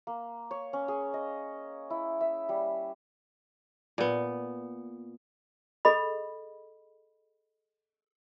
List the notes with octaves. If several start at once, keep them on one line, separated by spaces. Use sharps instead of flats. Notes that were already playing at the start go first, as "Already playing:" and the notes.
A#3
C#5
C#4
G#4
D#5
E4
E5
G3
A#2 B3
G#4 A4 D#5 B5